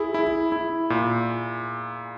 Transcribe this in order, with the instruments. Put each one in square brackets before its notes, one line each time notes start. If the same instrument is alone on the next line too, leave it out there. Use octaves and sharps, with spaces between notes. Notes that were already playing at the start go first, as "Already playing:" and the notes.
Already playing: [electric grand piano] E4 [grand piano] G#4
[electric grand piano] E4
E4
A#2